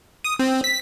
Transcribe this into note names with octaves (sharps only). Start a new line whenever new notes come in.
D#6
C4
B6